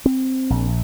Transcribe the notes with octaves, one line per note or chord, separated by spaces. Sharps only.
C4
A#1